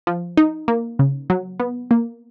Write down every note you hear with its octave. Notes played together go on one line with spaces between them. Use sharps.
F3
D#4
A#3
C#3
F#3
B3
A#3